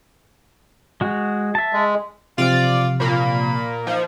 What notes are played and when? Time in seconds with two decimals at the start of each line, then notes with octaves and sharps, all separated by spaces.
1.01 G#3 F#4
1.55 E5 A5
1.73 G#3
2.38 C3 F3 F4 D5 F6
3.00 A#2 A#3 B5
3.87 F3 D#4